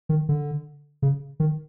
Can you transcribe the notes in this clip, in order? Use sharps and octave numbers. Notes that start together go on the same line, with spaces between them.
D#3
D3
C#3
D#3